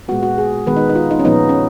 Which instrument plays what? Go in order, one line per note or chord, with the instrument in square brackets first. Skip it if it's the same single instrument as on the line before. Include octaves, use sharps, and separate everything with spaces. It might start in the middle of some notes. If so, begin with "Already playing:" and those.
[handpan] A#2 G#3 B3 F#4
F#4
G#4
D#3 G#3 B3 B4
D#4
D#4
F4
D#4
C#4
A#2 F3 B3 D#4
C#4